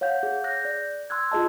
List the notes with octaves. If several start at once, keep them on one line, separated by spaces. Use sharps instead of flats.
C#5 F5 F#5 G6
G#4
F#6 G6 A#6
D5
C6 E6 F#6 G#6
F4 G#4 D#5 A5